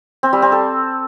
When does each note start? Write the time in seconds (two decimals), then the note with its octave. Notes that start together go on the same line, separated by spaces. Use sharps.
0.23 C4
0.33 G3
0.42 C4
0.52 A4